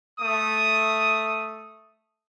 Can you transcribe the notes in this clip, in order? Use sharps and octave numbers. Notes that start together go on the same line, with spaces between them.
A3 D#6